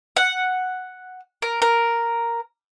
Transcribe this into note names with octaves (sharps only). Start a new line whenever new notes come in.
F#5
A#4
A#4